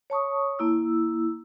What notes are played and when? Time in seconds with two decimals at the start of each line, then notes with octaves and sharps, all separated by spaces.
0.10 C#5 A5 C#6 D#6
0.59 A#3 E4 E6